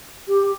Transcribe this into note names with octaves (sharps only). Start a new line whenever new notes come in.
G4